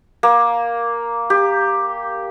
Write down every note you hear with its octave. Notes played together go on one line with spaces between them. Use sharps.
A#3
G4